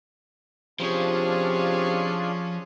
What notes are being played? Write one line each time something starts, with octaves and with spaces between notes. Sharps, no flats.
C3 F3 C#4 D4 F4 G#4